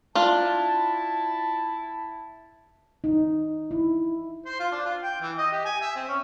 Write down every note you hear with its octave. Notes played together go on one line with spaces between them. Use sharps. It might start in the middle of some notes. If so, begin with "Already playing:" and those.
D4 E4 F4 A5
D#4
E4
C5
F4
D4
F4
G5
E3
D#5
G4
G#5
E5
C4
C#4